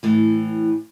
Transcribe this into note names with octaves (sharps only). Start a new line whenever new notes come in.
A2 E3